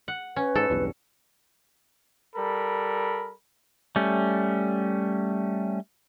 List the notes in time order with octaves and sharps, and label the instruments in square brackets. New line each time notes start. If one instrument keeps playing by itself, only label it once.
[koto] F#5
[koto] C#4 [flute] B4
[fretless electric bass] G#2 [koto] A4
[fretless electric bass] B1 E2 G2
[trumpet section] G3 A4 A#4 B5
[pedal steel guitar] G3 A3 C#4